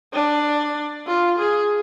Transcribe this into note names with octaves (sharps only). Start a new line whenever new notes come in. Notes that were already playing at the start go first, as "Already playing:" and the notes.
D4
F4
G#4